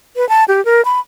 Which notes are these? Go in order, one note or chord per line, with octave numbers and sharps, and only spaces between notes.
B4
A5
G4
A#4
B5